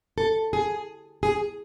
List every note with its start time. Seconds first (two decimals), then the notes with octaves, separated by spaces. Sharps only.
0.18 A4
0.53 G#4
1.23 G#4